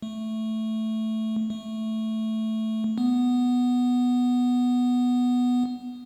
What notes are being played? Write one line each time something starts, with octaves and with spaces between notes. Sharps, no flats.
A3
A3
B3